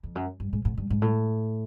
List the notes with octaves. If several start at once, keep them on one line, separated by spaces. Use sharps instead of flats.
F2
F#2
G2
G#2
G#2
G2
G#2
A2